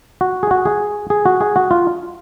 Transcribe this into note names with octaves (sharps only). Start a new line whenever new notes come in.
F#4
G#4
F#4
G#4
G#4
F#4
G#4
F#4
F4